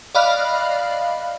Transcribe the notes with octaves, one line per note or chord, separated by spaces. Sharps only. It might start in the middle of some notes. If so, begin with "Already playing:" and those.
D5 D#5 F5 B5 F6 F#6